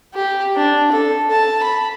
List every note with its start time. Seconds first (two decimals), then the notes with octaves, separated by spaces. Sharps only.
0.15 G4
0.56 D4
0.92 A4
1.31 A5
1.63 B5